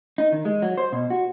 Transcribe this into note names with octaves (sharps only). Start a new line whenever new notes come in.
D#4
D#3
G#3
F#3
C5
B2
F#4